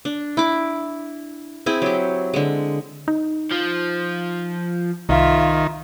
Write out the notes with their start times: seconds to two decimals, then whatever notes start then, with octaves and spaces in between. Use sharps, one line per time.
0.05 D4
0.37 E4 D6
1.66 C4 E4 G#4
1.82 F#3 G4
2.34 D3 G#3
3.08 D#4
3.51 F3
5.09 C2 D#3 F4 E5